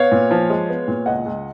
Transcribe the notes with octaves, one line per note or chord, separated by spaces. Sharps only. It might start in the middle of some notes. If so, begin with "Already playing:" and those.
Already playing: B3 C#5 F5
A#2
F3
G#3
B3
A#2
C#2 D#5 F#5
C#2